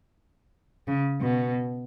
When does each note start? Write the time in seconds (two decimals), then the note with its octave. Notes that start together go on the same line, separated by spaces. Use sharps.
0.87 C#3
1.20 B2